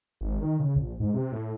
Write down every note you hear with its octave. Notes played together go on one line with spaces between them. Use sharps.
G#1
D#3
C#3
A#1
G#2
C3
A2